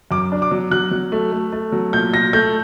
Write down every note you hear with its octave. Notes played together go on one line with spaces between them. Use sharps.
F#2 D6
D4
D6
F#3
F#3 F#6
F#3
A3
A3
A3
F#3
A#2 G6
A#2 A#6
A3 G6